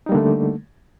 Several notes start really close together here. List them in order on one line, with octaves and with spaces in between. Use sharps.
D#4 G3 A#3 D3 A3